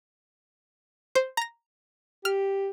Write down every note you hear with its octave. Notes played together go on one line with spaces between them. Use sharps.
C5
A#5 A#6
G4 F6